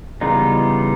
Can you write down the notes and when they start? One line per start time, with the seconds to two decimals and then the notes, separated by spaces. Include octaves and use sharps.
0.21 C#3 E3 G3 B3 D#4 F4